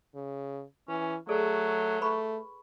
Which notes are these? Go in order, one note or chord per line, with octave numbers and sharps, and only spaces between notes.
C#3
E3 C#4
F#3 A3 G#4 A4 D5
A3 B4 B5 C#6